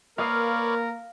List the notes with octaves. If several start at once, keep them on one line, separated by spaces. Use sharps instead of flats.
A#3 A#4 B4 C#5 D5 F5 D#6 C7